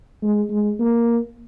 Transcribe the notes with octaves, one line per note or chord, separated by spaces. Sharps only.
G#3
G#3
A#3